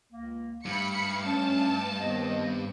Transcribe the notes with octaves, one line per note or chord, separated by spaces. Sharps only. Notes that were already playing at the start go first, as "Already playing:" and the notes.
C#2 A#3
G2 A3 F5 B5 C#7
C#4 A5
D#2 B3 C4 D#5